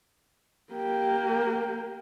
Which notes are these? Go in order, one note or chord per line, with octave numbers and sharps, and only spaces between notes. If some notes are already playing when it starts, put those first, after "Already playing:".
A#3 G4